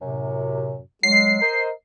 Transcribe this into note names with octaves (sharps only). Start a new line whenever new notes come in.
F#2 A2 C3
F#3 G#3 C7
A#4 C5 D#5